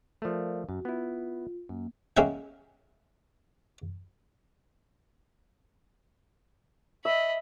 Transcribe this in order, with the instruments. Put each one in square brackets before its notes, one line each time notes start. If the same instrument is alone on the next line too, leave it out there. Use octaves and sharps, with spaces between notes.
[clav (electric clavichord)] F3 A3 [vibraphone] A#4 D5 F5
[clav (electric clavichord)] F#2 [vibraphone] F#4
[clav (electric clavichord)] B3 E4 [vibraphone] F4
[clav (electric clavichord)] F#2 [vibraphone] A#3
[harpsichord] G#3 A#3 C#4 E5 F#5 G5
[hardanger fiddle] D#5 B5 [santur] E5